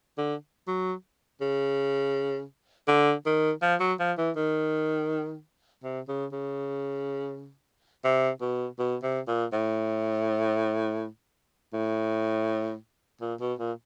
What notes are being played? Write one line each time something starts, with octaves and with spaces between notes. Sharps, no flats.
D3
F#3
C#3
D3
D#3
F3
F#3
F3
E3
D#3
C3
C#3
C#3
C3
B2
B2
C3
A#2
A2
A2
A#2
B2
A#2